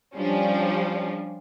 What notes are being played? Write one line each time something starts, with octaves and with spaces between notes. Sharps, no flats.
F3 G3 C#4 D4